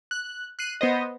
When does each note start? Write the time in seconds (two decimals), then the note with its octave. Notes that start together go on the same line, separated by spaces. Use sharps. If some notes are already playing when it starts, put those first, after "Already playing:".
0.11 F#6
0.59 F#6 C7 D#7
0.81 B3 C5 D#5